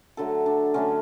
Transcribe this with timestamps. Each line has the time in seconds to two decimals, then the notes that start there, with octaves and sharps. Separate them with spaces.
0.17 D3 F#3 A3 A4
0.46 D4
0.74 D3 F#3 A3 C#4